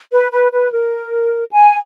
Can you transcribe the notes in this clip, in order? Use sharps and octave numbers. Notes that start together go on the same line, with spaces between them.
B4
B4
B4
A#4
G#5